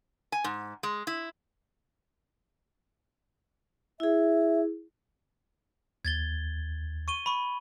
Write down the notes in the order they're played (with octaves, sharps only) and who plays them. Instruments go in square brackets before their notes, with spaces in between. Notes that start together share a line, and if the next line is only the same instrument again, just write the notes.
[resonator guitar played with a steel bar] G#5
G#2
G#3
E4
[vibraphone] E4 G#4 [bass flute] E5
[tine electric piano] D#2 [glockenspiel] G#6 A6 G7
[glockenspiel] C#6 D#7 G7
B5 C#6